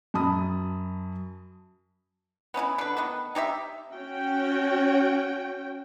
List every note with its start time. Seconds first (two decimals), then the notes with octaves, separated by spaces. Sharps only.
0.14 F#2 A5 B5 D#6
2.54 B3 C#4 D#4 E4
2.78 D3 B4
2.97 D#3 A3 B3
3.35 D#4 G4 C#5 E5
3.93 C#4 F#4 G5